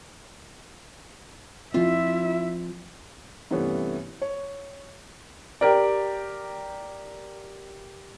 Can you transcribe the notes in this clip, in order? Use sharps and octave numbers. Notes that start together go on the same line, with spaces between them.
F3 C4 E4 F4 E5
G2 C3 E3 A3 B3 C#4
C#5
G4 A#4 D5